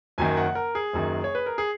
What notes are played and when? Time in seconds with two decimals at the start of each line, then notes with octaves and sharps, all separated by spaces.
0.18 F#1 F#2 D#3 G#5
0.37 F#5
0.55 A#4
0.75 G#4
0.93 F#1 F#2 D#3
1.24 C#5
1.35 B4
1.46 A#4
1.58 G#4